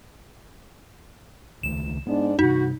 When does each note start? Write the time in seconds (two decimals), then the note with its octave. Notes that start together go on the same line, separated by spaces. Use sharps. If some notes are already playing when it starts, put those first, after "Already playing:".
1.63 C#2 D#3 A3 E7
2.07 G#2 B3 D4
2.39 G2 C3 D#4 F#4